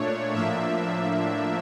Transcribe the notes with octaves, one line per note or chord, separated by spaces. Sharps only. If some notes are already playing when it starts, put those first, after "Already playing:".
Already playing: A#2 A3 D4 C#5
A2 F3 A#3 D4 E5